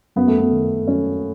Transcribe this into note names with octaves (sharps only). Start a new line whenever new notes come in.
F#2 B3
A3
B3
D#3
F#2 C#4